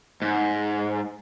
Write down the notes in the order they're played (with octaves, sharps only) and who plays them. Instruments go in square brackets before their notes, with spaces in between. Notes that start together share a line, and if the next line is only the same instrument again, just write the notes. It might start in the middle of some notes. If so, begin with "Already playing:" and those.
[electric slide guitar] G#2